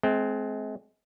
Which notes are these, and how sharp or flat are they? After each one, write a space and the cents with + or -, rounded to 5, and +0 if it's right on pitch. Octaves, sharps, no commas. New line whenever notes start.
G#3 +35 C4 +0